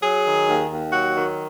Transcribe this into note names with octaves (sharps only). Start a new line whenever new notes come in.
F#3 G#4
D#3
D#2
D#2
F#3 F#4
D#3